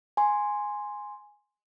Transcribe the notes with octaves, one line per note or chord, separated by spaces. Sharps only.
G#5 C6